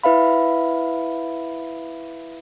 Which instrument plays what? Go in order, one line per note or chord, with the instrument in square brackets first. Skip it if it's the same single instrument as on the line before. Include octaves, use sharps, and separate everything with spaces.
[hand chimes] E4 B4 E5 F5 B5